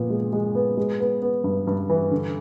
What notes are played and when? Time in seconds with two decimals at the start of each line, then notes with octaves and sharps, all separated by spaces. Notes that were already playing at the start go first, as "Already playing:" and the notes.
Already playing: A#2 F3 B3
0.10 G#3
0.33 G#3
0.55 B3
0.77 G#3
1.00 B3
1.22 B3
1.44 G2
1.67 G2
1.89 E3
2.11 D3